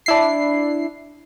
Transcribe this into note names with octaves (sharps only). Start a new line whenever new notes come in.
D4 E4 C7